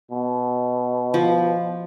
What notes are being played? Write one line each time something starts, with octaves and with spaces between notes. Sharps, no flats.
B2
F3